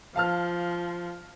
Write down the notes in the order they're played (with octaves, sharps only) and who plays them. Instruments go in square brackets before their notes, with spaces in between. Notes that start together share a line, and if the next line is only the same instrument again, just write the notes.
[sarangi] F3 [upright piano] F5 A5 F6